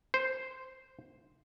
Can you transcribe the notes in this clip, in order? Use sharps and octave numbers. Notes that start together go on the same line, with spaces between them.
C5